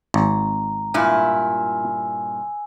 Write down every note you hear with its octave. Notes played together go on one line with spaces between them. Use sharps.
G#1 A#5
G2 A#2 E4 G#5 E6